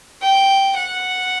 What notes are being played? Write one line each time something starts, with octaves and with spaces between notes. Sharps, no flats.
G5
F#5